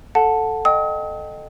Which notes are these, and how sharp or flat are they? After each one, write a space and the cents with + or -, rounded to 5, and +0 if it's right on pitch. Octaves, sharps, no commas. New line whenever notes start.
A4 +0 F#5 -15 A5 +0
D#5 -20 G5 +0 D#6 +45